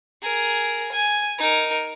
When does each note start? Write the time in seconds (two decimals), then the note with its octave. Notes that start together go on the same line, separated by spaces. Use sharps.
0.22 G#4 A#4
0.92 G#5
1.39 D#4 A#4